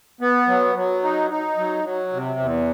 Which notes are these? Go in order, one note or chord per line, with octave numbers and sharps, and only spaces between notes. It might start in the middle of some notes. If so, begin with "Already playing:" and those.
B3
F#3
F#3
D#4
D#4
F#3
F#3
C3
E2